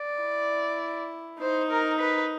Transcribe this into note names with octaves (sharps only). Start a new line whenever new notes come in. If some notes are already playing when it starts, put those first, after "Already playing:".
Already playing: D5
E4
D#4 C5
A#4
B4